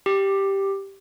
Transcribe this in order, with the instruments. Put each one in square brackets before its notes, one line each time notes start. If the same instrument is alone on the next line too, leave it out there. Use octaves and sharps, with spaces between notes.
[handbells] G4